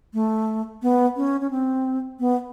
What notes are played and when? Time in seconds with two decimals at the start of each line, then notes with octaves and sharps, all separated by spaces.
0.14 A3
0.82 B3
1.16 C#4
1.41 C#4
1.51 C4
2.20 B3